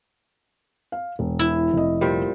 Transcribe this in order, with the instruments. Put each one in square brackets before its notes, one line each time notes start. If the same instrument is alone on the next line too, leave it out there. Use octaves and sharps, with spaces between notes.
[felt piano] F5
E1
[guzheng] E4
[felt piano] F1 D#5
[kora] A#2 G3 C5